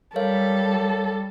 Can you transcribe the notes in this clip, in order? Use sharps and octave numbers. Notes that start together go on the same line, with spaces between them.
G3 A4 A#4 C#5 F5